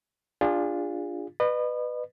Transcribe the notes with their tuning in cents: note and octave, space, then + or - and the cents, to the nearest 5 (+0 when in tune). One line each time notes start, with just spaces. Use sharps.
D4 +0 F4 +0 G#4 -30
B4 +5 D#5 -40